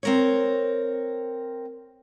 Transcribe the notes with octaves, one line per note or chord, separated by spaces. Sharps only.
C4 A#4 C#5